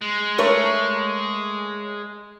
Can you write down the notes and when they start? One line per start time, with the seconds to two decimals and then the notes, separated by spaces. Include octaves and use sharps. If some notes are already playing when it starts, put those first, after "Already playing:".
0.01 G#3
0.38 A3 A#4 C#5